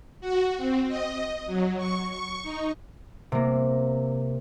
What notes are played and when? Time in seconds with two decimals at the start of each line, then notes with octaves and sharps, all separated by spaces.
0.21 F#4
0.58 C4
0.88 D#5
1.47 F#3
1.77 C#6
2.10 C#6
2.43 D#4
3.32 C3 A#3